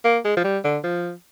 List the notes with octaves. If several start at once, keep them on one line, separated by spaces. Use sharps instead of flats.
A#3
G#3
F3
G3
D3
F3